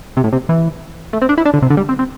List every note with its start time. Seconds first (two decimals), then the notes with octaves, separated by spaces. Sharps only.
0.17 C3
0.24 A2
0.33 C3
0.49 E3
1.13 A3
1.22 C4
1.29 D4
1.38 E4
1.45 D4
1.54 D3
1.62 C3
1.70 D3
1.77 G3
1.89 C4
1.99 C4